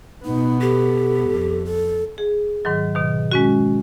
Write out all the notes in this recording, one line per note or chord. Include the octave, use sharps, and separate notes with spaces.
B2 B3 D#4
G4 A4
F2
A4
G#4
G#2 D#3 F#3
B2 D#3
G#3 C#4 F#4